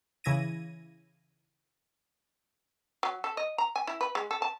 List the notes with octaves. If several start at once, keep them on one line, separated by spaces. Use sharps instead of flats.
C#3 E3 E4 G#6 A#6 D#7
F#3
A4
D#5
A#5
G#5
E4
B4
G#3
A4
A5